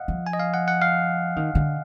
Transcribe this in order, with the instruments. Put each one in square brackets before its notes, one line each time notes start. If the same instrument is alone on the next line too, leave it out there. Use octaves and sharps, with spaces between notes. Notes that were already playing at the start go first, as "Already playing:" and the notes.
Already playing: [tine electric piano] D#5 F5 F#5
[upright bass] F3
[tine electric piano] G#5
D#5
F5
F#5
F#5
F5
[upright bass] D#3
D3